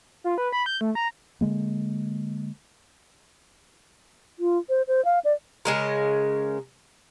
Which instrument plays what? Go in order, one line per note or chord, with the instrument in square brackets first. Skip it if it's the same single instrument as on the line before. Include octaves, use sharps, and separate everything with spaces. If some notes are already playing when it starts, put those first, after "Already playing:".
[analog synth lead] F4
B4
B5
G6
A3
A#5
[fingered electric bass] D3 G#3 A#3
[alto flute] F4
C5
C5
F5
D5
[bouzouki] C#3 G#3 A#4